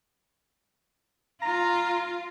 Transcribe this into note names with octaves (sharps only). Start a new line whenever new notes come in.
F4 A#5